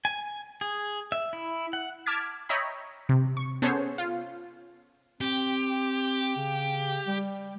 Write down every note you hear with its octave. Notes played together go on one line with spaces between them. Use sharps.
G#5
G#4
E5
E4
F#5
A5 D6 F6 G#6 B6
C#5 D#5 E5 G5 A#5 B5
C3
C#6
B3 C#4 G#4 A4 C5 C#5
F4
C4 G4
C#3
G3